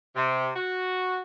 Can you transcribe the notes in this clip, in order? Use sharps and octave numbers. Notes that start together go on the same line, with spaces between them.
C3
F#4